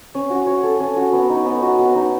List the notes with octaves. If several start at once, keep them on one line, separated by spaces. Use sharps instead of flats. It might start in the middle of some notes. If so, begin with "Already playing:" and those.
C#4
F#4
C#5
A4
C#4
F#4
B3
D#4
B3
F#4
B3
D#4